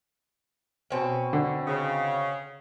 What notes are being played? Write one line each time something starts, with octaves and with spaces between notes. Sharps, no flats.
B2 C4 C#4
D3
C#3